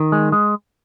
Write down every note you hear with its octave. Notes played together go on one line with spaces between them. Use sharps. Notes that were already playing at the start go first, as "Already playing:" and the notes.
Already playing: D#3
G#3
G#3